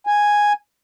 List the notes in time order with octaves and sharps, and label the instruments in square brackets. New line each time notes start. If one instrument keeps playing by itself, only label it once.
[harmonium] G#5